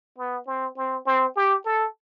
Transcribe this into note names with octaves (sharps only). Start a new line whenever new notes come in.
B3
C4
C4
C4
G4
A4